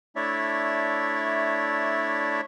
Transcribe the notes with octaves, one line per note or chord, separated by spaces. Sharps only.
A3 D4 E4 C#5 D5 E5